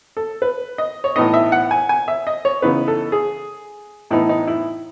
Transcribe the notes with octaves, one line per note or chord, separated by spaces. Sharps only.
A4
B4
D#5
C#5
A2 E3 B3 D#4 D#5
E5
F#5
G#5
G#5
E5
D#5
C#5
C#3 E3 B3 D#4 B4
A4
G#4
A2 E3 B3 D#4 E4
D#4
E4